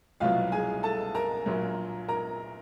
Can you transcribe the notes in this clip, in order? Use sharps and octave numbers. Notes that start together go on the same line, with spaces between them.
C2 B2 F#3 F4 F5
G#4 G#5
A4 A5
A#4 A#5
A#1 A#2 F#3
A#4 A#5